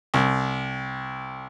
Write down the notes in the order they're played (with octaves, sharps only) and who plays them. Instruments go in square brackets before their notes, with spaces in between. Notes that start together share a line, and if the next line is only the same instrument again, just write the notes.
[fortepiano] C2